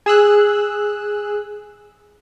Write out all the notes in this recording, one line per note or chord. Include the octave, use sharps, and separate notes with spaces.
G#4 E6 F#6